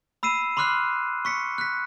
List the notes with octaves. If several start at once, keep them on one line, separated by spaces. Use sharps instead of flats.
B5 E6 C7 D#7 E7
B5 C6 D6 F6 F#6 C7
C#6 B6 C#7
F#6 B6